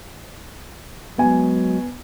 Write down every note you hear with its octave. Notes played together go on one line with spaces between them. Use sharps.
F#3 G#3 B3 F#4 G#5